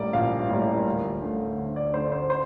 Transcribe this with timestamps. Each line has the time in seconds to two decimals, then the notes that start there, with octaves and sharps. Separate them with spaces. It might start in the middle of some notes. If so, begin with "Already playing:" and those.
Already playing: A#1 A2 G3 A#3 D5
0.13 A#1 F5
0.49 A2 G3 A#3
0.86 D2
1.22 D3 A3
1.58 D2
1.76 D5
1.94 D3 A3 C5
2.12 C5
2.30 C5